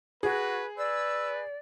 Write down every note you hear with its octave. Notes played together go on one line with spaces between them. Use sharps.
F#4 G#4 B4
B4 D5 E6